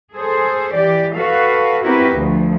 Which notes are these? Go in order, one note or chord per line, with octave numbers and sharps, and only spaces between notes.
G#4 A4 C5
E3 G4 D5
F#4 A4 B4 F5
C4 E4 F#4 G4 A#4 B4
D2 F3